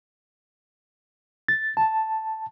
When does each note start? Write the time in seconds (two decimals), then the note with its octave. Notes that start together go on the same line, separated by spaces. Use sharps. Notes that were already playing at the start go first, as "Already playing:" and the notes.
1.48 A6
1.77 A5